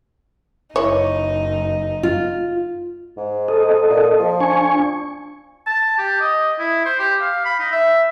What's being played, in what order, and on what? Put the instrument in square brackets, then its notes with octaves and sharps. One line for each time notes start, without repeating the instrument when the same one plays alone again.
[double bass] F#1 [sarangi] D#4 [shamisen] E4 C#5
[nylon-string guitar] F4
[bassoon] G#2
[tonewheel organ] A4 D#5
[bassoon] A#2
F3
[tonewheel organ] D4 G#5 C#6
[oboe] A5
G4
D#5
E4
C5
G4
F5
B5
D#4
E5